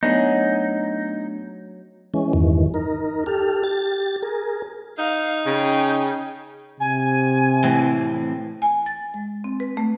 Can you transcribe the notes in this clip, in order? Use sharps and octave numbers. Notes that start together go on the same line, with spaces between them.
F#3 A3 B3 D4 D#4 G#4
E3 G#3 C#4
E2 G2 D#3 E3
D#4 A#4
G4 A4 F6
G4 A6
G#4 A#4
D#4 F5
C#3 G#4 G5
C3 G#5
A2 E3 C4
G#5
A6
G#3
C4
B4
A3